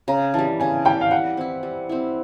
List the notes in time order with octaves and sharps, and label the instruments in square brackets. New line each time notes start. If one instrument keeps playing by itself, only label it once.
[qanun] C#3 [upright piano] A#5
[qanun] E3 G3 [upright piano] A5
[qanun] C#3 [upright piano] G#5
[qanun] E3 G3 [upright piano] G5
[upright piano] F5
[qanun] G3 [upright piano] F#5
[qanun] C4 E4
G3
C4 E4